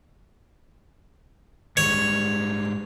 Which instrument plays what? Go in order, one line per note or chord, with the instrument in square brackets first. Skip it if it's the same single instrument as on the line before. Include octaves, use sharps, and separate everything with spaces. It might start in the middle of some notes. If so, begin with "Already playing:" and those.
[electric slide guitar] G#2 G3 G#3 [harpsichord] C#5